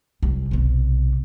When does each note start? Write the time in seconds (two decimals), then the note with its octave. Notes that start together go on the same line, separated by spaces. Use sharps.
0.23 C2
0.51 B1 C3